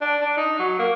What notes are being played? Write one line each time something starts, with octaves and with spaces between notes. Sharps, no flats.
D4
D4
D#4
F#3
A#3